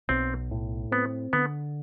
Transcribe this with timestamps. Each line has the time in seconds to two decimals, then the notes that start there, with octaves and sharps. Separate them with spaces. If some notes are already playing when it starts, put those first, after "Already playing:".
0.09 B1 C4
0.51 A2
0.91 B3 C4
1.33 D3 B3